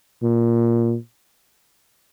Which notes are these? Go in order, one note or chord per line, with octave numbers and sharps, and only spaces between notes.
A#2